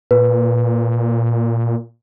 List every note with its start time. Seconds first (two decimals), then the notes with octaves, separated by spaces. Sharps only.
0.11 A#2 B4